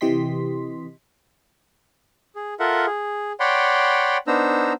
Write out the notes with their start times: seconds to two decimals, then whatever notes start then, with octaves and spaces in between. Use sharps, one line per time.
0.01 C3 E3 G4 D#5 C6 B6
2.36 G#4
2.60 F4 A4 A#4 E5 F#5
2.86 G#4
3.40 C#5 D5 F#5 G5 B5 C6
4.27 B3 D4 D#4 C5 A#5 E6